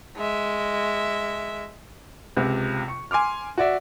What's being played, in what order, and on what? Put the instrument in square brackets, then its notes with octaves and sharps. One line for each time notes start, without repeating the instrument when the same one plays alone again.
[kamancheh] G#3 E5
[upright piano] C#2 C3
C#6
G#5 C6 D6 F6
F#4 D5 E5